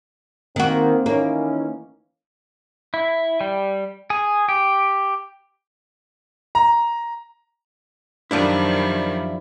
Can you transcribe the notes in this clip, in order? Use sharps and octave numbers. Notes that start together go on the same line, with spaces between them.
D#3 A#3 C4 F#4
D#3 E3 A#3 C#4
E4
G3
G#4
G4
A#5
F#2 D#3 F3 G3 D4 E4